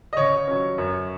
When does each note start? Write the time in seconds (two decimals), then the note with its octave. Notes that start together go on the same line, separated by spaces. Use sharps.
0.13 D#5
0.17 C#3 C#5
0.47 F#3 C#4
0.78 F#2